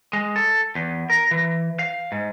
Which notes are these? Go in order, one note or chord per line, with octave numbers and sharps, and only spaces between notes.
G#3
A4
E2
A#4
E3
F5
G#2